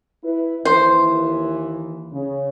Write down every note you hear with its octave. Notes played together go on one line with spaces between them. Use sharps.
E4 B4
D#2 E3 C5
C#3